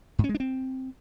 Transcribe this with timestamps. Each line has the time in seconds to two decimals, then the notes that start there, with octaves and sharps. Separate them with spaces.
0.19 G#2
0.24 C#4
0.29 G#3
0.35 D4
0.40 C4